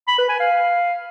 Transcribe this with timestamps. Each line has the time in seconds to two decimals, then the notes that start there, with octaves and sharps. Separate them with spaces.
0.08 B5
0.18 B4
0.29 G#5
0.40 F5